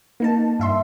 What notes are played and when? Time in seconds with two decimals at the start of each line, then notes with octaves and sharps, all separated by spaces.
0.20 A#3 D#4 A5
0.59 G2 E5 C6